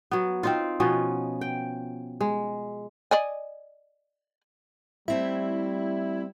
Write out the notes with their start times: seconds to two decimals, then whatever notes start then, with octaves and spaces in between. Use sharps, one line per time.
0.11 F#3 B3
0.43 C4 D#4 F4
0.80 B2 F3 B3 C#4
1.41 G5
2.21 G#3
3.11 D5 D#5 G#5
5.08 G3 A3 C4 E4 E5